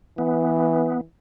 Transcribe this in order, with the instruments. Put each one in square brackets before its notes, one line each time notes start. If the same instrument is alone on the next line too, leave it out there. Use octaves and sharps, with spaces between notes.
[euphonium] E3 [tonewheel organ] B3